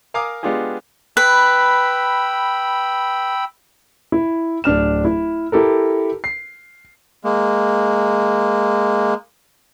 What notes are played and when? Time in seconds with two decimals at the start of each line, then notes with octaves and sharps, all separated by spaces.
0.14 A#4 F5 G#5 A#5 D6 D#6
0.43 G#3 B3 D4 F4 G4 G#4
1.17 B4 G5 B5 E6
4.12 E4
4.64 D1 D4 F6 E7
5.05 E4
5.52 E4 G4 A4 A#4
6.24 C7
7.24 G#3 A#3